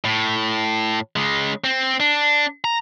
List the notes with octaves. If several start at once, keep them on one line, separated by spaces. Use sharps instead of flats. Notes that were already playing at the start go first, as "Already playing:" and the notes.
A2
C#3 G#3
C4
D4
A#5